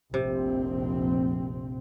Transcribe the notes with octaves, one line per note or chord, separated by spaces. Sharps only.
F1 A#1 C3 C4